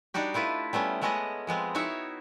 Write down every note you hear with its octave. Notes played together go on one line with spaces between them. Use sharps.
G3 D4 D#4 F#4 G4
A3 E4 F4 B4
G3 A3 B3 C#4
G#3 A3 B3 C#4 D#5 F#5
F3 G#3 B3 C4
D#4 E4 F#4 C#5 E5